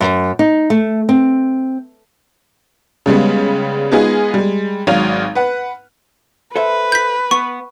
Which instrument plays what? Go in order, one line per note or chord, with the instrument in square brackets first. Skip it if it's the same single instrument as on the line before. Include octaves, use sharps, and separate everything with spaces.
[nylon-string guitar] F#2
D#4
A3
C4
[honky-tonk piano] C#3 G3 G#3 B3
G#3 B3 D#4 F4 G#4
G3 G#3
G#1 G#2 F#3 F5 F7
B4 F#5
[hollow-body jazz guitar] A4 C5 E5 [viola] B4
[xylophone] G6 B6
[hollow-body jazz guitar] B3 [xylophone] C#6